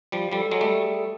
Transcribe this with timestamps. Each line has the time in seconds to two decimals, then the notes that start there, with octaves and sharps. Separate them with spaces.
0.12 F3 G3
0.32 F3 G3 A4
0.51 F#3 G#3
0.61 G3 A3
0.83 G#4
0.96 A4